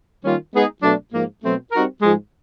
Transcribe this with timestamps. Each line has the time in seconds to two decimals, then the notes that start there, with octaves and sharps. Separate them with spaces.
0.23 D#3 G3 A#3 C#4 F4
0.52 G#3 B3 D#4 G#4
0.82 B2 F#3 A3 D4
1.12 G#2 F3 A#3
1.42 B2 F#3 A3 C4
1.72 G3 C4 D#4 F#4 A#4
2.02 G#2 F3 G#3